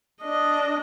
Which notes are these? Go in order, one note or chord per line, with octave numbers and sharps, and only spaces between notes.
D4 D#5